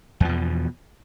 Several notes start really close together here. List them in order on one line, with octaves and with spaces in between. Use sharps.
E2 F3 B2